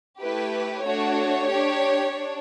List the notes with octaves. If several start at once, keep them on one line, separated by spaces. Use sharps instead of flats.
A3 E4 G4 B4
A3 D4 F#4 C#5
G4
D4
D4